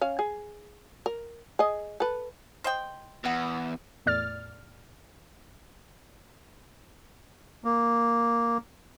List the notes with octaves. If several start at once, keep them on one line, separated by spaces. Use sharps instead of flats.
C#4 F5
G#4
A#4
G#4 D#5
A4 B4
C5 D#5 G5
E2 B4 F#5 D#6
E2 A2 D5 F6 A6
A#3